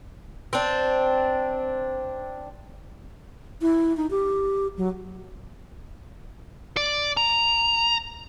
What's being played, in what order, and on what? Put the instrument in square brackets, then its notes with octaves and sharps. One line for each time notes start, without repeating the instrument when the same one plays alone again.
[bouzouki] C4 D4
[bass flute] E4
D#4
G4
F#3
[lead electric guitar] D5
A#5